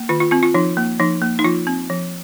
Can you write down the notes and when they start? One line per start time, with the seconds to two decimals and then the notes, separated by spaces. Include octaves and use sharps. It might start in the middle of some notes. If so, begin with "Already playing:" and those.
Already playing: A#3
0.09 D#3 F4
0.20 F4
0.31 C4 F4
0.43 F4
0.54 F3 D#4
0.77 A#3
1.00 F3 D#4
1.22 A#3
1.39 D#4
1.44 F3 F4
1.67 C4
1.90 F3